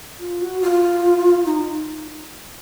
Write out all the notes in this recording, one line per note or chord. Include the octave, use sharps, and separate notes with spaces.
F4
F#4
F4
D#4